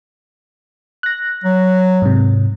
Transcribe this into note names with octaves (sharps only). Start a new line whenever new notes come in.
F#6 A#6
F#3
G#2 C3